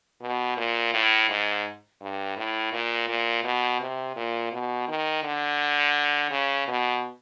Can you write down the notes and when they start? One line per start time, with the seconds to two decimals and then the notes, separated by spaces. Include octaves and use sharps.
0.21 B2
0.57 A#2
0.94 A2
1.29 G#2
2.01 G2
2.37 A2
2.73 A#2
3.09 A#2
3.44 B2
3.81 C3
4.16 A#2
4.52 B2
4.88 D#3
5.24 D3
6.31 C#3
6.68 B2